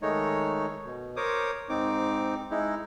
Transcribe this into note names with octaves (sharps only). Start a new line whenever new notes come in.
D#3 G#3 A3 D#4 C#5
B2
A#4 C5 C#5 D6 D#6
G#2 C4 D#4 D6
G#3 D#4 E4